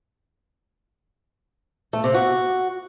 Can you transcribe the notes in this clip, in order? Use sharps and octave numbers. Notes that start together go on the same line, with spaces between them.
A3
C3
F#4